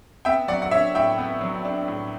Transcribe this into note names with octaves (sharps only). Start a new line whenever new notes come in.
B3 E5 G5
F#3 D5 F#5
F#5
D4 C#5 E5
A2 E5 G5
B3
F#3
D4
A2